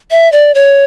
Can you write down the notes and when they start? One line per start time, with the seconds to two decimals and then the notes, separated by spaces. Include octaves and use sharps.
0.11 E5
0.32 D5
0.55 C#5